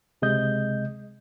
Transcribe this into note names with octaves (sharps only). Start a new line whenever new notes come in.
C#2 C3 G#3 D#5 G6